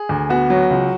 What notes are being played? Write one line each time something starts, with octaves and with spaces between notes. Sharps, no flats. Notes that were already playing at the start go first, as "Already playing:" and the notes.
Already playing: G#4
D2
B3 F#4
F#3
C#2